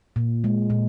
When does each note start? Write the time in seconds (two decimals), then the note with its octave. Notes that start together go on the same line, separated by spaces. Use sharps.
0.16 A#2
0.44 G#3
0.70 A#2